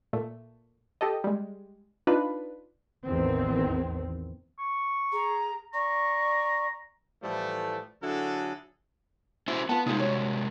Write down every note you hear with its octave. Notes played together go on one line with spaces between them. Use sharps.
A#2 A3
G4 A4 D#5
G3 G#3
D4 D#4 F4 B4
A1 E2 D#3 C4
C#6
G#4 A#5
D5 A#5 C#6
A2 E3 F3 G3 A3
D3 F#3 E4 F#4 G#4 A4
C#4 E4 F#4 C5
B3 F4 A5
C3 G3 G#3 D#4 F4 C5
F#4 C#5